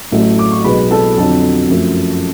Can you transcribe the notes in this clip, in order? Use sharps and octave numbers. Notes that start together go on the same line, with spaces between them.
A1 A2 F#3 A3
D6
C#6
B1 B2 G#3 B4 B5
A4 A5
F2 D3 F#3 A4 A5
F#2 F3 A3